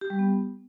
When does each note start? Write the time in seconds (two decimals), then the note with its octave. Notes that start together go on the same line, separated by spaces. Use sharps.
0.01 G4
0.10 G3
0.19 B3